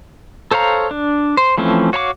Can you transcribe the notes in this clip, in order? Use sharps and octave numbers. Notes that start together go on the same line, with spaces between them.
A4 C5 C#5 F5 A#5
D4
C5
E3 F3 A3 C4 C#4
F#4 C#5 F5 A#5 D6